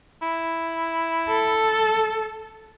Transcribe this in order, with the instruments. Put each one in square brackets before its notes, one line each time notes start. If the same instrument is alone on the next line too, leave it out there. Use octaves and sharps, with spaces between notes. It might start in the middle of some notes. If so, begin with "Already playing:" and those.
[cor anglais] E4
[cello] A4